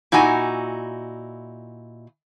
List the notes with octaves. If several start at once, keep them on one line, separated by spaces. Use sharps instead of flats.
A#2 D#4 E4 F#4 G#5